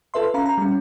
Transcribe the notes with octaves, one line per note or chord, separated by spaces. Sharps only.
F4 A4 B4 E5 C6
C#4 F5 A#5 B5
A#5
G3 C#4